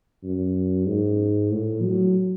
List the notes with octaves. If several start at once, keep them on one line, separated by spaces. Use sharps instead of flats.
F#2
G#2
A2
F#3